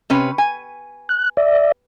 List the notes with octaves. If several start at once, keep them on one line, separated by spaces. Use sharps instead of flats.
C3 C#4 B4
G#5
F#6
D5 E5